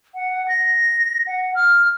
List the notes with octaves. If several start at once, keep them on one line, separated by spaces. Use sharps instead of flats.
F#5
A#6
F#5
F6